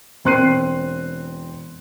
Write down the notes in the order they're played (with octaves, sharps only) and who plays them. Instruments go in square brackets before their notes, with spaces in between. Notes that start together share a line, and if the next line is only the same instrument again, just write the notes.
[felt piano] E1 C4 C6 F#6 C7 D#7